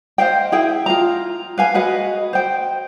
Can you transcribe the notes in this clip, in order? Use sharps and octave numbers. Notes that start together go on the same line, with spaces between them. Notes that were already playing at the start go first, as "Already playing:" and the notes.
C5 D#5 F5 G5
E4 G#4 G5
F4 A#5
B4 F5 G#5
F#4 G#4 B4 D#5
C5 G5